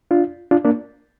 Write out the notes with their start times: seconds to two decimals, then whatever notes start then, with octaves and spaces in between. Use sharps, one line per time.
0.11 D4 F4
0.51 D4 F4
0.65 A#3 D4